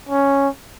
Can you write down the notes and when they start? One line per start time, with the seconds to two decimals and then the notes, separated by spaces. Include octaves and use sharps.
0.09 C#4